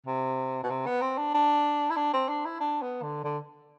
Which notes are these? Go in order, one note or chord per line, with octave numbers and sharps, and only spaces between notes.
C3
B2
C3
B3
C4
D4
D4
E4
D4
C4
D4
E4
D4
B3
D3
D3